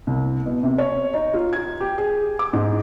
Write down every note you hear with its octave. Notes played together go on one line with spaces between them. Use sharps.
C2
B2
C3
C#5
D#4
F4
G#6
G4
G#4
D6
G#2